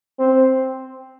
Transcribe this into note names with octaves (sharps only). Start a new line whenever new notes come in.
C4